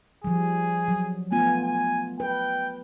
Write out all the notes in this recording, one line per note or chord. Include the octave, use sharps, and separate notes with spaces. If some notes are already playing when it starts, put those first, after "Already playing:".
F3 G3 G#4
F#3
A3 B3 F4 G#5
G#5
B4 G5